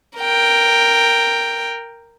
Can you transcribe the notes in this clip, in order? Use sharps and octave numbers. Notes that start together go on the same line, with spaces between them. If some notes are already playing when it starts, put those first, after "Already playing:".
A#4 G5